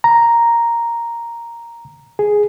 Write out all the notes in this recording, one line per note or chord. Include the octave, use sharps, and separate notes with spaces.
A#5
G#4